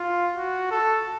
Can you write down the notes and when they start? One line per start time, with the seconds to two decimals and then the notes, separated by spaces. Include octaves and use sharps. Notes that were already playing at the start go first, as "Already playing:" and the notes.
Already playing: F4
0.36 F#4
0.71 A4